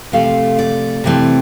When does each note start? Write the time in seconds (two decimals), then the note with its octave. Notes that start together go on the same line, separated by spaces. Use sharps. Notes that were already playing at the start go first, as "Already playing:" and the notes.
0.12 C3 F3 A3 F5
0.59 D5
1.04 C3 E3 A3 C4